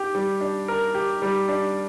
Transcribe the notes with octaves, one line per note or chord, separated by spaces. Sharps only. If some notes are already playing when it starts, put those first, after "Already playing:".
Already playing: G4
G3
D4
A#4
G4
G3
D4